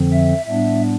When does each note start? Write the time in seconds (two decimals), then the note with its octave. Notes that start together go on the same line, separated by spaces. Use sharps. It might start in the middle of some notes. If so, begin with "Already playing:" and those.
Already playing: F2 D3 F3 C4
0.12 E5
0.46 A2 G3 B3 D4 E5